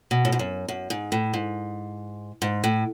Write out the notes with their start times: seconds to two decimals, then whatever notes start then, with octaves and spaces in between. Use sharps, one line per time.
0.11 B2
0.25 A2
0.32 G#2
0.39 F#2
0.68 F#2
0.90 G#2
1.12 A2
1.34 G#2
2.42 G#2
2.64 A2